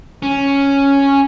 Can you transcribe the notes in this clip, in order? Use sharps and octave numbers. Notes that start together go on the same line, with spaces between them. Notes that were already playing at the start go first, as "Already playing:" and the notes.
C#4